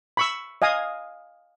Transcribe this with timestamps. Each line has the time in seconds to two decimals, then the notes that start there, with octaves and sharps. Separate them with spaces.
0.17 B5 C#6 E6
0.62 D#5 F5 G#5 D#6